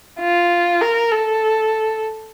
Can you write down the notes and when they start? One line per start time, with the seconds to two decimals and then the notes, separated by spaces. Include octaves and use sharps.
0.19 F4
0.81 A#4
1.11 A4